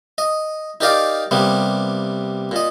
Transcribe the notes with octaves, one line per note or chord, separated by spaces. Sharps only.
D#5
D#4 G4 A#4 D5 D#5 F5
C3 G3 A#3 B3
A#2 D#5